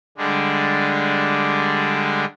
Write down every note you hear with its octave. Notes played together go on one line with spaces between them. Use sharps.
D3 G3 G#3 D4